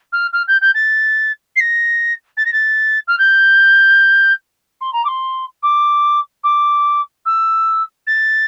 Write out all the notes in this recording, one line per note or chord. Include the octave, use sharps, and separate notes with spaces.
F6
F6
G6
G6
A6
C7
A#6
A6
A#6
A6
F6
G6
C6
A#5
D6
C6
D6
D6
E6
A6